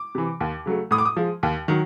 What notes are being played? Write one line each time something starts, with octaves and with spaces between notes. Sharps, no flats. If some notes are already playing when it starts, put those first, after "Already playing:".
Already playing: D6
C3 E3
D#2
C#3 F#3 A3
A2 D#6
D6
D#6
F3 G#3
D#2
D#3 F#3